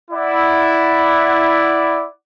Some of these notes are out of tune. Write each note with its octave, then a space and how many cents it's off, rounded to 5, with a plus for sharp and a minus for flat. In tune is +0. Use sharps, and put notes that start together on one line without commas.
E4 +0 D5 +0 F#5 +0